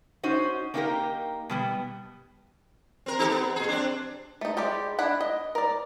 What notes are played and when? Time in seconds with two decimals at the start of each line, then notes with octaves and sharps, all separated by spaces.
0.23 C#4 D#4 F#4 C5
0.74 A#3 C4 D#4 F4 G4 A#4
1.50 B2 G3 B3
3.06 C4 A#4
3.19 D#4 G4 A4
3.30 B3
3.56 A#2 G#4
3.69 C4 D4
4.41 A3 D#4
4.57 G3 G#3 G4 D5
4.99 D4 E4 F#5 B5
5.21 D#5
5.55 A#4 D5